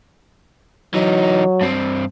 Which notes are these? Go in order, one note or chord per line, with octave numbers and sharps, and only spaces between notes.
E3 F#3 D#4
G2 C4